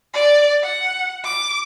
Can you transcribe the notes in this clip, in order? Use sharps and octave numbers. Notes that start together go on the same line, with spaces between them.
D5
F#5
D6